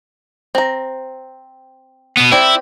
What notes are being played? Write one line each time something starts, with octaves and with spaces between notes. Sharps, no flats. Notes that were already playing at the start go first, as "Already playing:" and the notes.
C4 A#5
B2 B3
C4 E4 G4 D5